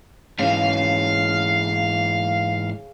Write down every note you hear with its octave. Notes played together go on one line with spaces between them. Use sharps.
G#2 C#3 E3 F5